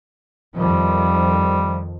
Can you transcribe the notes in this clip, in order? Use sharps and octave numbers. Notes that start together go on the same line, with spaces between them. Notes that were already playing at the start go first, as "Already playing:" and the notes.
F2 D#3 F3 G3